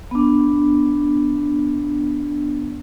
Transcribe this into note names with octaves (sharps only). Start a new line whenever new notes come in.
B3 D4